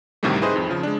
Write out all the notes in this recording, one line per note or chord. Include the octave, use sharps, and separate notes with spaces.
D2 A2 C3 D#3 G3 A3
D#4 E4 G#4 B4 C5 D#5
F2
C#3 F3
G#3 D4